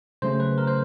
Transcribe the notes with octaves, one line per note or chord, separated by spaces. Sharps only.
C#3 F#3 A3 C#4 C5
B4
A#4
C5